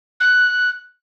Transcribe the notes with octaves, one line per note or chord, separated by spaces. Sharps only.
F#6